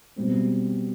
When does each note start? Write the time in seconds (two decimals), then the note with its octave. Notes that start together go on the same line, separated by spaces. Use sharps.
0.16 B2 G3 C4